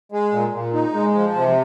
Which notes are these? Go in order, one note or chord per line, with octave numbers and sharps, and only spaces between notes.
G#3
A#2
A#2
D#4
G#3
F3
C3